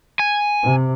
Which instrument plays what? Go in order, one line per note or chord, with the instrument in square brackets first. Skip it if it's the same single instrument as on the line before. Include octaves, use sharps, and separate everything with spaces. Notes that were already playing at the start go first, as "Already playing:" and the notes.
[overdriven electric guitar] G#5
[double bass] C3